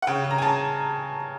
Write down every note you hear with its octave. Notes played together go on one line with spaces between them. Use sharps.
F#5
C#3 G5
C#3
A#5
G#5
C#3 A5